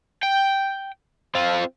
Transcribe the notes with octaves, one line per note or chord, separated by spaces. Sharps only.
G5
C4 F4